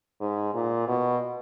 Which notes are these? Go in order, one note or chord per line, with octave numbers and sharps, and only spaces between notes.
G#2
A#2
B2